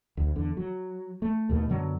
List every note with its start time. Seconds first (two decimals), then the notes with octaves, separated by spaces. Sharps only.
0.17 D2
0.36 E2 D3
0.57 F#3
1.22 A3
1.49 D#2 B2 G3 A3
1.69 F#2 D3 F#3 B3